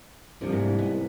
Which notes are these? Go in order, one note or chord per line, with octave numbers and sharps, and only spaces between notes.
C2 D3 F3
D2 G#2 A#3
B3